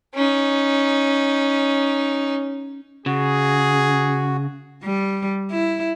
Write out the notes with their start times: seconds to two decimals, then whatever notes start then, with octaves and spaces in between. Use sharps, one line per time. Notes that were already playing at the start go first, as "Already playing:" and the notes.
0.14 C#4 D#4
3.06 C#3 F#4 G#4
4.83 G3
5.51 E4